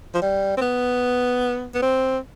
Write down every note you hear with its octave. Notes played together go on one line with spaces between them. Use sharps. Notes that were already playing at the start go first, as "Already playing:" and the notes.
F3
G3
C4
B3
B3
C4